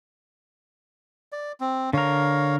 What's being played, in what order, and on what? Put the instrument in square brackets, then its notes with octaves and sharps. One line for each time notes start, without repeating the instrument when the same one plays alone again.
[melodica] D5
C4
[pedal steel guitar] D3 A#4 [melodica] C#5 F5